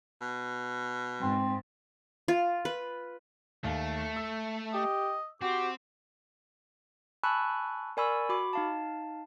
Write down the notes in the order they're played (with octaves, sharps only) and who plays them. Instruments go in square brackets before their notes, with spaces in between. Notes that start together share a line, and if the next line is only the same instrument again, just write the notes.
[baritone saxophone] B2
[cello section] G#2 [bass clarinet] C4
[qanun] F4
B4
[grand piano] D#2 [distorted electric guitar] A3
[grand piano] E6
[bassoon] G4 [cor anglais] D#5
[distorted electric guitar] C4 [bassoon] F#4 [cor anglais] G4
[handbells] G#5 A5 B5 C#6 E6 F#6
A#4 D5 G#5 B5 C#6 E6
F#4 B5 D6
D#4 F5 A5